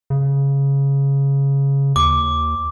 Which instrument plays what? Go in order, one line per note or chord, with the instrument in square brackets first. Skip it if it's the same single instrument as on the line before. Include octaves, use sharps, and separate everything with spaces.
[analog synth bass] C#3
[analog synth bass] D#2 [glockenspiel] D6